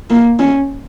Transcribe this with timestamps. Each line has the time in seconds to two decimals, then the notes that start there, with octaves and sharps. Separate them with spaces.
0.10 A#3
0.39 C#4